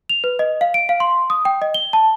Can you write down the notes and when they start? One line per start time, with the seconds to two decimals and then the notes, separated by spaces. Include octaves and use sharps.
0.09 F7
0.24 B4
0.39 D#5
0.61 F5
0.74 D7
0.89 F5
1.00 C6
1.30 D#6
1.45 G5
1.62 D#5
1.74 G7
1.93 A5